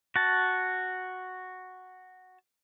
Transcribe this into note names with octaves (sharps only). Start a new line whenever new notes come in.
F#4 A5